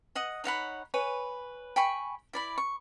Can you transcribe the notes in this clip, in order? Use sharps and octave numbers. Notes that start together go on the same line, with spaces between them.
D#5 F#5 D#6
D#4 C#5 F#5 B5
B4 C#5 G#5
G5 G#5 B5 C#6
E4 D5 B5
C#6